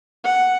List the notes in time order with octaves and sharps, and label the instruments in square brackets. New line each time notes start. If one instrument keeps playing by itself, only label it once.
[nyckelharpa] F#5